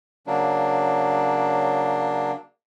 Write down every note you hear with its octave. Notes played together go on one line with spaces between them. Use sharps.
C#3 F#3 A#3 D4